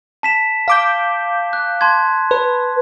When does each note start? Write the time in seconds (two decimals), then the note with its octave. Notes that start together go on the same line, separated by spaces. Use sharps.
0.23 A5 B6 E7
0.68 F5 D6 G6
1.53 F#6
1.81 A5 C6 G#6
2.31 B4